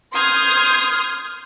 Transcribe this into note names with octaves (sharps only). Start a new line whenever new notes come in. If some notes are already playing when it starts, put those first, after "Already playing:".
C6 D#6 F6 G6 G#6 C7